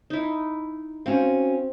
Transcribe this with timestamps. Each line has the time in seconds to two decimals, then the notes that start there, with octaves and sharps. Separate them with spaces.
0.10 D#4 E4
1.06 C4 C#4 F#4 F5